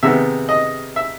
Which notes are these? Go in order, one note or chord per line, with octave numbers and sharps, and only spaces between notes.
C3 D#3 G#3 B3 E5
D#5
E5